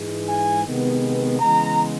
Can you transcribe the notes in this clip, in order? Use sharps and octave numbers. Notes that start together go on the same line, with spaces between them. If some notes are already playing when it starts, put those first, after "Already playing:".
Already playing: G#2 E3 G#3
G#5
C3 D#3 G#3 B3
C#3 E3 G#3 B3 A#5